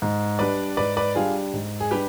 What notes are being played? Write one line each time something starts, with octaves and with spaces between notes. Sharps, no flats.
G#2
G3 D4 B4 D5
G#2 B4 D5
B4 D5
G3 D4 F4 G#4
G#2
G#4
G3 D4 G4 B4